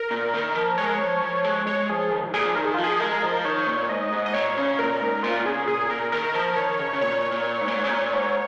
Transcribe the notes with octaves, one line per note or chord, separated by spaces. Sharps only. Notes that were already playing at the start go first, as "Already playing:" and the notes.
Already playing: A#4
A#2
D#3
F3
G#3 C#5
A#4
C#5
F3
F3
G#3
G#3 C#5
F3 G#4
D#3
G#2
A#2 G#4
F3
D#3 A#4
G#4
F3 F4
G#4
G#3 A#4
F3
D#3 C#5
A#2
G#2 D#5
G#2
D#5
A#2 C#5
C#3
A#2 A#4
G#2
A#2 F4
C#3 G#4
A#2 G#4
A#2 A#4
D#3 A#4
F3
D#3 C#5
C#3
C#3
A#2 C#5
A#2
G#2
A#2
G#2
C#3
A#2
G#2